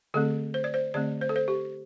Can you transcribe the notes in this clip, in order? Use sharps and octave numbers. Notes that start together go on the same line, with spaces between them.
D3 A3 C4 A4
C5
D5
C5
D3 A3 C4 D5
C5
A4
C5
G4